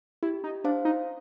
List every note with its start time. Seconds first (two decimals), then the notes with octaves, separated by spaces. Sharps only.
0.23 E4 G4
0.44 D#4
0.64 D4 C5 F5
0.85 D#4